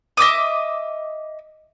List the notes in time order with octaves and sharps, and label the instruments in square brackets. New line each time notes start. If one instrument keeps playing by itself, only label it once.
[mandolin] D#5 E5 D6 D#6